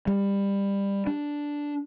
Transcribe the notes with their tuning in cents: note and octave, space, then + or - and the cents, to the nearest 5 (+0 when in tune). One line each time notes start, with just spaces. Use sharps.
G3 +20
D4 -5